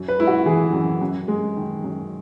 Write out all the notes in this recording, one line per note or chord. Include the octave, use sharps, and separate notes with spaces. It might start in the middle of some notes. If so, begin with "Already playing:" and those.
Already playing: F#2
B4
G#3 E4
F#4
E3 G#4
F#2
F#2
G#3
D#3
F#2